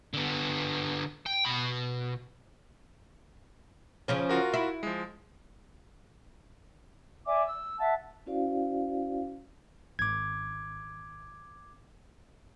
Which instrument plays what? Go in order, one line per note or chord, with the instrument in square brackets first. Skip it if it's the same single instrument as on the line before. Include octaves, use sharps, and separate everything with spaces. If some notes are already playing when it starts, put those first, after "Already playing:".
[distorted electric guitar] D3 B3
G5
B2 B5
[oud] C#3 F3 C#4
[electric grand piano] F4 F#4 A#4
[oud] E4
[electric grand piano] F3 G#3
[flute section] D5 E5 G#5 D6
E6
E5 F#5 A5
[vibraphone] C#4 E4 F#4 C5 D5 F5
[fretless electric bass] G#1 [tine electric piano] D6 G#6